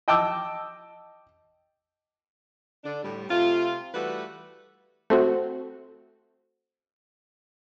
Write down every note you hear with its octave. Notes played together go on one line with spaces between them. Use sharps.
D#5 G5 A5 D6 E6
D3 D4
A2 D3 G3
C3 A3 F4
E3 G3 A3 F#4 B4
A3 C4 F#4 A4 C5